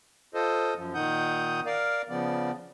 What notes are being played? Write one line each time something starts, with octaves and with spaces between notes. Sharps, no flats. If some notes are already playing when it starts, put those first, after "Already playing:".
F4 A4 C5 D#5
F#2 F3
A#2 D#3 D#4 F#5 D#6 G6
A#4 D5 F5
C#3 F3 B3 D5